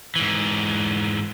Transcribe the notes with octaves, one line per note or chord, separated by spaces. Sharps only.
G#2 E3